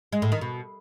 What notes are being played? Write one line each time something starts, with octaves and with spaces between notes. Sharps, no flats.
G#3
A2
D#3
B2